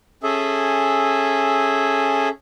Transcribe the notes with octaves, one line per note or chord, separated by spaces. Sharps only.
C#4 G#4 A4 E5